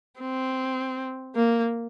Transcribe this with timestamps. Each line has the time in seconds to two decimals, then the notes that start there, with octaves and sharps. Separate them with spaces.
0.20 C4
1.36 A#3